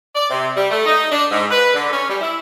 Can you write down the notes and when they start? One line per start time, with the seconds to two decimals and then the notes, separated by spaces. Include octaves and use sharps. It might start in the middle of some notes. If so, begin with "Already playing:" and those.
0.15 D5
0.29 C3
0.56 G3
0.70 A3
0.85 D#4
1.11 D4
1.30 G#2
1.51 B4
1.74 D3
1.92 C#4
2.08 G3
2.21 E4